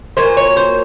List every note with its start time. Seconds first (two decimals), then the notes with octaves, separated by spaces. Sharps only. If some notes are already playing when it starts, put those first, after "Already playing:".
0.17 A#2 F#3 C5
0.37 C#5
0.57 C5